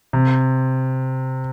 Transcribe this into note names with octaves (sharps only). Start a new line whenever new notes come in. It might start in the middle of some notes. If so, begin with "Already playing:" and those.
C3